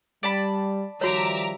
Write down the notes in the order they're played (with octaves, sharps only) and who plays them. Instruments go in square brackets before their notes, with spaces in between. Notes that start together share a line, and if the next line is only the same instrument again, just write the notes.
[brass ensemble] G3 [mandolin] D5 A5 B5
[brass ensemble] D#3 F3 G3 [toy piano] F#4 C#5 [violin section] E5 A#5 D6